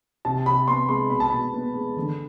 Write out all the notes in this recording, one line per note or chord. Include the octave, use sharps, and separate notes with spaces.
C3 A5
C3 B5
B3 C6
G#3 C6
B2 B5
A5
B2 B5
B3
G#3
D3